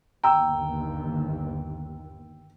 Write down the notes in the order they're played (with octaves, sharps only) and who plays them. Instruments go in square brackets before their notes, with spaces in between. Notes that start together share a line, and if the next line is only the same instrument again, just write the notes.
[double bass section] G1 D#2 [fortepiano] G5 E6 [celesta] A#5